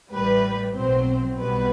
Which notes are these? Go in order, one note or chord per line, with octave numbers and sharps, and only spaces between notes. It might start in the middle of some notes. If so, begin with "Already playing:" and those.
A1 A2 G3 B4
B1 A2 F#3 C4 C5
B1 B2 G3 B3 B4